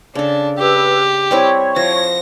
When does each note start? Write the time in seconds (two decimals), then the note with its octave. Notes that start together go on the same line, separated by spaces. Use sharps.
0.15 C#3 D4 A4
0.58 G4 B4 E6
1.31 G3 C4 E4 C#5 C#6
1.76 F3 A#6